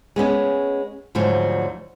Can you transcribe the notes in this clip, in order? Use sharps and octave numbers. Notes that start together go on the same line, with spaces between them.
G#3 B3 C#4
D2 G#2 F3 F#3